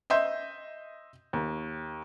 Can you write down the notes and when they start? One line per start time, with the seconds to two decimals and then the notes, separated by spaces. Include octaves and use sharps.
0.10 D#5 E5 C6 G6
1.33 D#2